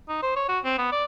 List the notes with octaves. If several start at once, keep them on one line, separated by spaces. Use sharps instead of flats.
D#4
C5
C#5
F#4
C4
B3
D5